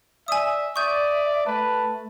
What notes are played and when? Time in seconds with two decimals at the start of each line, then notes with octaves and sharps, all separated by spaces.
0.28 D5 E5 G#5 D#6
0.76 D5 E5 C#6 D#6 G6
1.46 A3 B4 A5